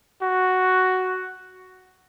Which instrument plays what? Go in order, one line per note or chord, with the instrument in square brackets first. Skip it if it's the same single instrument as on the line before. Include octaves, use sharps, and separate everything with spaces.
[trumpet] F#4